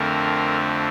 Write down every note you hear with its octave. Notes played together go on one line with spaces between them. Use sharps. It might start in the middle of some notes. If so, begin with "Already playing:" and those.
Already playing: F2 D3 A3 C4 A#4